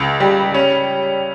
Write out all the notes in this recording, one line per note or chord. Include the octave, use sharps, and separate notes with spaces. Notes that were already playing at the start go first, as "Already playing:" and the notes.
Already playing: C#2
G3
C#4